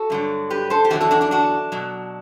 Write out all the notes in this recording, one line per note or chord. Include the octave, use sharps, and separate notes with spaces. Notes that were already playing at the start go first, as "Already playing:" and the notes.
Already playing: F#4 A4
G2 D3 F#3
G4 B4
A4 C5
G4
E2 D3 F#3 F#4 A4
F#4 A4
D4 F#4
D4 F#4
D4 F#4
B2 F#3